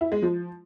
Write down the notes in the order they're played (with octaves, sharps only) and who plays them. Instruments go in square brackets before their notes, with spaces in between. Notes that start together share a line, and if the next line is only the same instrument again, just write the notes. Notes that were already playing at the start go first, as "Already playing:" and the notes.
[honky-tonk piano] E4
G#3
F3